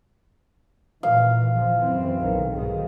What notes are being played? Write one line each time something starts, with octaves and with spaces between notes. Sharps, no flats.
A#2 E3 F5
G#1 F3
F#2 E3 C4
B1 D#3
B1 G#2 D#3